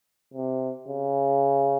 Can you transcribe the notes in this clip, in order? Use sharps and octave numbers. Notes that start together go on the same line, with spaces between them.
C3
C#3